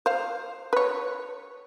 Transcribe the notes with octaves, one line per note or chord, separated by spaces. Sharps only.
C5 F5
B4 C#5